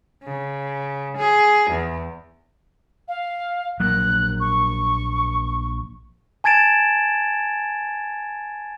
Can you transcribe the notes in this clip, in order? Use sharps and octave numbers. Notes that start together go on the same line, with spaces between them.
C#3
G#4
E2
F5
A#1 F#3 A#3 F#6
C#6
G#5 A5 G#6 A6 D7 E7